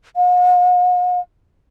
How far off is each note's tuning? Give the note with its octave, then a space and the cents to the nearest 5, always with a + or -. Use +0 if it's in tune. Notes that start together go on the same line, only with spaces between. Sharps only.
F#5 -45